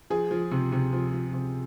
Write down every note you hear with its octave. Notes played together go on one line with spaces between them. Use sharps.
F3 G#4
F3
C3
C3
F3
F3
C3